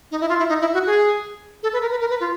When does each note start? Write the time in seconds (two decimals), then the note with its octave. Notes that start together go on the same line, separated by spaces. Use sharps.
0.11 D#4
0.21 E4
0.29 F4
0.39 E4
0.49 D#4
0.61 E4
0.74 F#4
0.86 G#4
1.63 A4
1.73 B4
1.81 A#4
1.91 B4
2.00 A#4
2.10 B4
2.20 F4